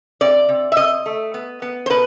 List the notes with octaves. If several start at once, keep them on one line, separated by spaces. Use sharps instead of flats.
C3 D5
C3
E5
C3 D#5
A3
B3
B3
C5
B2 B4